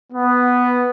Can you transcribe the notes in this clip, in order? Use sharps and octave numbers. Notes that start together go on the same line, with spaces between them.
B3